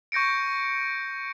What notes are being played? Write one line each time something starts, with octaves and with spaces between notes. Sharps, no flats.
C#6 G6 A#6 C#7 D7